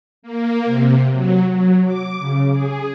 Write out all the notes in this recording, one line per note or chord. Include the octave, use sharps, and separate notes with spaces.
A#3
C3
F#3
F#3
D6
C#3
G#4